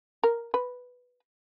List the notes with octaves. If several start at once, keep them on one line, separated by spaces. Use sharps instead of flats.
A#4
B4